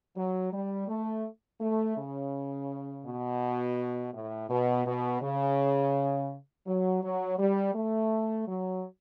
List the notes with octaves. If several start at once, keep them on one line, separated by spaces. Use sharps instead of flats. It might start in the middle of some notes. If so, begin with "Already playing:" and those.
F#3
G3
A3
A3
C#3
B2
A2
B2
B2
C#3
F#3
F#3
G3
A3
F#3